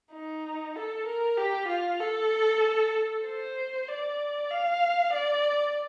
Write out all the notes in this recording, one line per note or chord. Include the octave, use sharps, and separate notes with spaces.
D#4
A4
A#4
G4
F4
A4
C5
D5
F5
D5